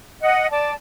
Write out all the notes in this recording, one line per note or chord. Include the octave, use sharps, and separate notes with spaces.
D#5 F#5
D5 A5